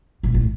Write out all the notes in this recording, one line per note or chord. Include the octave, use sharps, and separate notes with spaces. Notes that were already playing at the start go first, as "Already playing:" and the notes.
A2
A2